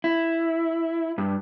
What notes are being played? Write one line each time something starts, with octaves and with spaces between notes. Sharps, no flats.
E4
G2